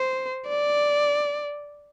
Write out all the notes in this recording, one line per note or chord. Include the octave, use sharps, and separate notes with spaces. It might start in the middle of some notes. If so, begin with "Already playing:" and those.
Already playing: C5
D5